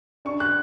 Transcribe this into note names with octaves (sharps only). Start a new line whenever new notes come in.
D4 C#6
F#6